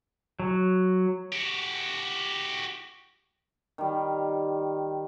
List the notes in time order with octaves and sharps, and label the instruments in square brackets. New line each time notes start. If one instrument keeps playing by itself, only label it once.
[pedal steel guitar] F#3
[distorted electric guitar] F#4 G4
[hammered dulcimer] D#3 G3